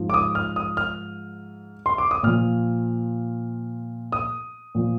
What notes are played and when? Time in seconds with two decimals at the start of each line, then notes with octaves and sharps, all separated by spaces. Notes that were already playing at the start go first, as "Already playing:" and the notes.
Already playing: G#2 F3
0.10 D6
0.14 D#6
0.35 F6
0.56 D#6
0.77 F6
1.86 C6
1.98 D6
2.11 D#6
2.23 A#2 F3 F6
4.12 D#6
4.75 A#2 F3